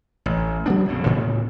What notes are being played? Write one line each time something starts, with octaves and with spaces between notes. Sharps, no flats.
A1
F#3 B3 D4
A#1 F2 C#3
D2 A2 C#3 B3